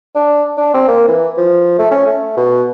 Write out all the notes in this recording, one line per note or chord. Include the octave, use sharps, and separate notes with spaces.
D4
D4
C4
A#3
E3
F3
A3
C#4
A3
B2